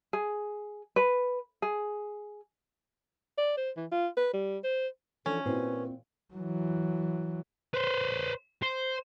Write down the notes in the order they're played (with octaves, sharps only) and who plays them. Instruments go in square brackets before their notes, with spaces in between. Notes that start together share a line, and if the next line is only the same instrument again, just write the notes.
[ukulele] G#4
B4
G#4
[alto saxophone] D5
C5
E3
F4
B4
G3
C5
[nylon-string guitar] E3 F3 D4 [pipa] C#4 [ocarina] A4
[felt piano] A#2 E4 F#4 [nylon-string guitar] C4 [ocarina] B4
[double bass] E3 F#3
[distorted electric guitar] B4 C5
C5